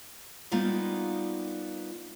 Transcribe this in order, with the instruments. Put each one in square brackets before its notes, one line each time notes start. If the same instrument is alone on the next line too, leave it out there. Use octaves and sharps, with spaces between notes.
[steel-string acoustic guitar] G3 A#3 B3 D#4 F4